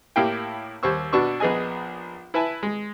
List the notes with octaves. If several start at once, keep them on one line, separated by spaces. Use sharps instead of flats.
A2 A#3 E4 G4 F5 G5
D#2 G3 C5 C#6 E6
B2 D4 B4 C#6 E6
A#1 B3 G#4 D#5 G#5
E4 B4 E5 G#5 A5
G#3